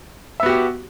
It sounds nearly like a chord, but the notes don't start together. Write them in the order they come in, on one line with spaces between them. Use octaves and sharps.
E5 B3 F#4 G4